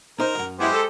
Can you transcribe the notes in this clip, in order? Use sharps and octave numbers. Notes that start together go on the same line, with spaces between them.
D#4 A#4 C5
C#2 F#2
G#3 B3 E4 G4 C5
A4